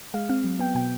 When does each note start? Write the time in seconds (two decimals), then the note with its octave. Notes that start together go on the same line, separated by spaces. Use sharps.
0.14 G#3 F5
0.29 C4 F5
0.44 F#3
0.59 B3 G5
0.75 B2 G5